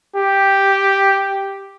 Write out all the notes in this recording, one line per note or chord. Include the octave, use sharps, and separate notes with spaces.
G4